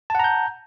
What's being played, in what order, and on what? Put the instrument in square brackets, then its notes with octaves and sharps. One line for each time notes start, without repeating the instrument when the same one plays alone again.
[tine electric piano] A5
F#5
A#5
G6